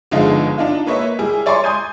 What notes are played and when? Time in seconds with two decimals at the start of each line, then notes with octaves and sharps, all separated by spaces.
0.12 G1 D3 F3 G#3 D#4 F5
0.58 D4 D#4 F4
0.86 A#3 B4 C#5 D#5 E5
1.19 G3 E4 G#4
1.46 C#5 D5 G#5 A#5 C6 C#6
1.64 G#5 C6 D#6 G6 G#6 D#7